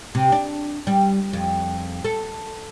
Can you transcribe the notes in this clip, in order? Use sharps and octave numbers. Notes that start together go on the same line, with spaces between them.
C3
D4
G3
F2
A4